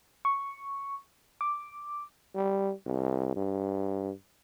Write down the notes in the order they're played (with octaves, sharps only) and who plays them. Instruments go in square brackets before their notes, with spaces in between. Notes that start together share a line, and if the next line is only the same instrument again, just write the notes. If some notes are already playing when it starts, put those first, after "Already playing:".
[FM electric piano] C#6
D6
[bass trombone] G3
C2
G2